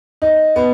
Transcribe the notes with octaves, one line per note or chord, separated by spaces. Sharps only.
D#4
B3